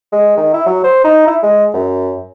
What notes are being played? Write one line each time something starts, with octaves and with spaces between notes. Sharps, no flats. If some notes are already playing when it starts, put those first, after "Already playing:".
G#3
D#3
E4
F#3
C5
D#4
E4
G#3
F#2